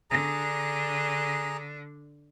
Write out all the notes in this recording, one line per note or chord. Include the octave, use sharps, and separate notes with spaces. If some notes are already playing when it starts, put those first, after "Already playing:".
D3 D4 G#4 A#5